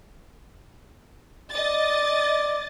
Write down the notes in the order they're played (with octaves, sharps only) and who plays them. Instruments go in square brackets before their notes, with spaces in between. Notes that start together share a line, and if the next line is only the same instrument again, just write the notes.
[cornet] D5 [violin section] D#5 A6